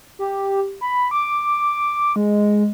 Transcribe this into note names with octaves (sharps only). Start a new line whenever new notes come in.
G4
B5
D6
G#3